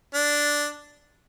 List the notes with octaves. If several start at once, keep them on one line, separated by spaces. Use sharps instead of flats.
D4